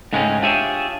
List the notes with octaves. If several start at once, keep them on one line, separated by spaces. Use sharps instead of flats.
G#2 C#3 G#3 A3 C4 C#4
D4 F4 G4 G#4 C#5 E5